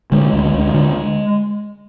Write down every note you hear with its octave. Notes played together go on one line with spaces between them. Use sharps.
D3 G#3
D2
D2
D3